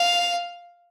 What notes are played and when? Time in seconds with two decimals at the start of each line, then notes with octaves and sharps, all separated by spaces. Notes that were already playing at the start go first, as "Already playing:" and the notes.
Already playing: F5